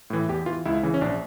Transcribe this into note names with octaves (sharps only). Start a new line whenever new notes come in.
A2 E3
E2 G4
E3 F4
C#2 E4
C#3 E3
C#4
A#1 D4